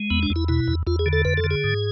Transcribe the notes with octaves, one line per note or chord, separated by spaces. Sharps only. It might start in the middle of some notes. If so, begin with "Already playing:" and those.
Already playing: G#3
E2 B3
D4
E2
E4
B2 E4
E2
E2 F4
G#4
D3
A4
F2 B4
A4
D3
G#4
G#2